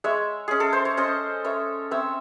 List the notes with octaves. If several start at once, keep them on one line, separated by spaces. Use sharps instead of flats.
G#3 C#5 E5
C#4 G#4
A4
C5
C#5
C#4 C5 D#5
C#4 C#5 E5
C4 C#5 E5